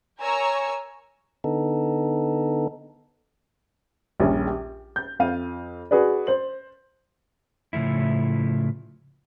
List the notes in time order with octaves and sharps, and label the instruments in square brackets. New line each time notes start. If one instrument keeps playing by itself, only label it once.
[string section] A#4 C#5 G#5 A#5 C#6 E6
[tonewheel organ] D3 B3 D#4 A4
[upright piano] A#1 D#2 G3 C#4
G4
G6
F2 F5 D#7
F#4 G#4 B4 D5
C5 F#7
[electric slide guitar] A2 C#3 F3 A3 E4